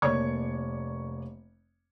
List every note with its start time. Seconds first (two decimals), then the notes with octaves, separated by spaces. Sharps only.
0.02 F1 A#3 C#5 D5 C#6 G#6